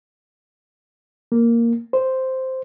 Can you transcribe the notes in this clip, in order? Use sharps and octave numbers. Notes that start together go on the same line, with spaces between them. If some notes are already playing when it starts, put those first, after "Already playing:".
A#3
C5